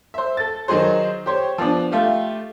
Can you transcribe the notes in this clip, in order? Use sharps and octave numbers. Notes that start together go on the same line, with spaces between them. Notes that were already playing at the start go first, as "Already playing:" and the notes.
C5 E5
A4 A6
D#3 F#3 D#4 G#4 C5
G4 C5 C#5
F3 B3 D4
A3 F4 G4